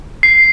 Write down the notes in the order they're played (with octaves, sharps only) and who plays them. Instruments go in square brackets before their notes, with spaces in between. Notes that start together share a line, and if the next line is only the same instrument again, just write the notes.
[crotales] C7